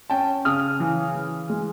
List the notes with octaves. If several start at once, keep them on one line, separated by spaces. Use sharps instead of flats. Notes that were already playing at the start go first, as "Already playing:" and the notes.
C#4 G5 A5
C#3 D#6 F6
E3
E3
G#3